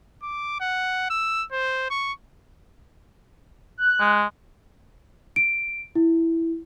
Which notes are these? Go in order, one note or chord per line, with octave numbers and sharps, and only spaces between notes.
D6
F#5
E6
C5
C#6
F#6
G#3
D7
E4